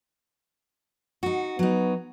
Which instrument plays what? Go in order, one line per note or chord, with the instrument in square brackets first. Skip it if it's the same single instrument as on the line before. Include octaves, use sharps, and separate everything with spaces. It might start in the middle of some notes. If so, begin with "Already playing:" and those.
[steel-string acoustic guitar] D#4 F#4
[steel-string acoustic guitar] F#3 D#4 [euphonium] B3